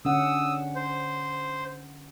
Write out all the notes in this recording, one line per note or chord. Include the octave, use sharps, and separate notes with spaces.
D3 C#4 F#5 D#6 E6
C5